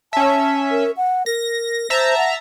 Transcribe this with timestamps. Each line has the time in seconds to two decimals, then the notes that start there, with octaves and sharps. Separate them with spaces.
0.13 C#4 E5 A5
0.71 A#4
0.97 F#5
1.26 A#4 A#6
1.90 C5 E5 A5 A#5
2.17 F#5